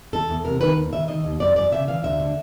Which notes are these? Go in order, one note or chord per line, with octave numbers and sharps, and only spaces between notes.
E2 A4
E2
C3 A#4
D#3 B4
D#2
D#3 E5
D#3 D#5
D#2
F#2 D5
F#2 D5
C#3 E5
E3 F5
D2 E5
D3